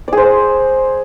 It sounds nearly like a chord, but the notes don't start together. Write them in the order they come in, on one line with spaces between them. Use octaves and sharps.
D5 G#4 C5